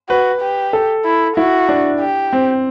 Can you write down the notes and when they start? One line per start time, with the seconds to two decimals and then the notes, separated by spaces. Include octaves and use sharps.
0.09 F#4 B4
0.41 G4
0.73 A4
1.05 E4
1.37 E4 F#4
1.69 D4
2.00 G4
2.33 C4